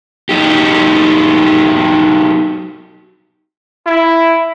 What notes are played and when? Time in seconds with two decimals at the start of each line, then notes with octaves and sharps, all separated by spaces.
0.29 F#3 D#4 G4
3.86 E4